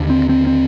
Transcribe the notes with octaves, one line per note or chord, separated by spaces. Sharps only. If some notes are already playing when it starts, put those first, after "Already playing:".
Already playing: D#2 D3
C4
C4
C4